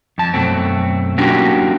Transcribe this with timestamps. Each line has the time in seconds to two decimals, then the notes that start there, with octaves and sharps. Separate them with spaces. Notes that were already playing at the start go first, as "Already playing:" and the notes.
0.18 F2 A5
0.34 F#2 B2 A3 C4
1.18 F#3 A#3 C#4 D4 F#4 G4